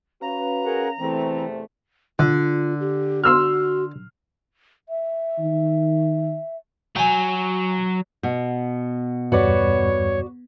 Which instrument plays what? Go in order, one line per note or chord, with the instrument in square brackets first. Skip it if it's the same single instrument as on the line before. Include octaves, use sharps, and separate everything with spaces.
[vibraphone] C#4 C#5 F5 [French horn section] F#4 B4 [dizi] A#5
[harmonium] G#4 A#4 F#5
[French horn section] E2 C3 A3 [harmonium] E3 C4 [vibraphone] C5
[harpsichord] D3 [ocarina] F4
[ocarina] G4
[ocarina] F#4 [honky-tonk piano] C6 E6 F6
[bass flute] E5
[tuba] D#3
[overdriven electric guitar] F#3 [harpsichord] G5 G#5
[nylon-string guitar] B2
[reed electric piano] E2 G2 G3 [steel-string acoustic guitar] F#4 B4 D5 [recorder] C#5